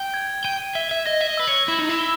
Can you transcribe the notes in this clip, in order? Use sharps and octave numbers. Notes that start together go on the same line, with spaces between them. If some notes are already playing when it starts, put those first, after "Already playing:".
Already playing: G5
G#6
G5 D#7
E5 G7
E5
D#5 A#6
E5
D#5
B4 E6
C#5
E4 E7
D#4
E4
G7